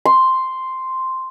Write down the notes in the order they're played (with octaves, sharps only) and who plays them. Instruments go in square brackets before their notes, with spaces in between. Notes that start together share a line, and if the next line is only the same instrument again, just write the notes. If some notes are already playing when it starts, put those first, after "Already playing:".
[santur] C6